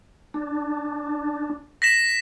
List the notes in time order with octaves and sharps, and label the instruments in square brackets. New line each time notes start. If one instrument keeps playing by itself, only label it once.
[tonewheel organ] D4
[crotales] A#6 B6 E7